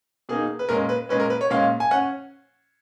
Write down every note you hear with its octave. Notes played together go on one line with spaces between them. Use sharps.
B2 A#3 D#4 G#4
B4
A#2 G#3 C#4 A#4
B4
A#2 G#3 C#4 B4
A#4
B4
C#5
A#2 G#3 C#4 F5
G#5
C#4 F#5